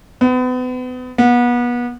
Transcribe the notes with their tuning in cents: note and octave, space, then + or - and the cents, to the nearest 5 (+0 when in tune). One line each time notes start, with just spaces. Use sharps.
B3 +35
B3 -30